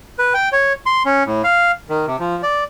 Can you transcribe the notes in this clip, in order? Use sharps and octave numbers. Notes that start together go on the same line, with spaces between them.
B4
G5
C#5
C6
C#4
A2
F5
D#3
C3
F3
D5